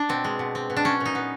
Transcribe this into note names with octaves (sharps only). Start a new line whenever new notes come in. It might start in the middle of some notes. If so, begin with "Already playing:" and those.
Already playing: D4
B2 C4
G#3
B2
C4
B2
D4
F#3 C#4
A#2
D#4
B3